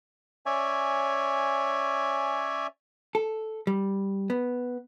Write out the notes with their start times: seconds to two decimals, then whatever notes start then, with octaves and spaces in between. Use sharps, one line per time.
0.46 C#4 C#5 D5 E5 G#5
3.15 A4
3.67 G3
4.30 B3